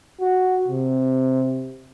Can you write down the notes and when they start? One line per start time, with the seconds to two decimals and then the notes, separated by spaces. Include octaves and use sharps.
0.20 F#4
0.68 C3